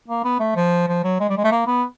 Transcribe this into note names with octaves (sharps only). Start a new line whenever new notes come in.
A#3
B3
A3
F3
F3
F#3
G#3
G3
G#3
A3
A#3
B3